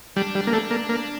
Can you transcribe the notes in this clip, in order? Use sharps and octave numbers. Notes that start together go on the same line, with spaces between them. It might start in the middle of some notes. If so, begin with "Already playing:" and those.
G3 D4
G3
A#3
A3 D4
A#3
A#3